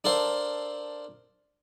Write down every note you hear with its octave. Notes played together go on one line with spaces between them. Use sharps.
D4 A4 A#4 C5 F5